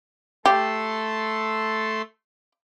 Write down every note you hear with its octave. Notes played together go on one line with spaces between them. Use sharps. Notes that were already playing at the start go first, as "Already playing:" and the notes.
A3 G4 A4 C6